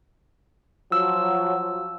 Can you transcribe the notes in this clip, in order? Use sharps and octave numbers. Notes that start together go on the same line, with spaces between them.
F3 F#3 E6